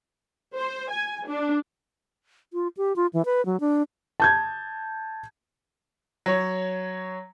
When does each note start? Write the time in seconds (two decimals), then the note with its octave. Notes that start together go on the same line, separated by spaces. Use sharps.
0.55 C5
0.91 G#5
1.28 D4
2.53 F4
2.77 G4
2.96 F4
3.13 E3
3.25 B4
3.46 F#3
3.60 D4
4.20 A5 G6 G#6
6.26 F#3 C#5